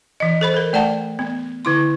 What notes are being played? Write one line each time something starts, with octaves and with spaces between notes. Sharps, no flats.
E3 D#5
A4 C5 B5
A4 A#4
A3 D5 F#5 A5
B3
D3 E4 C6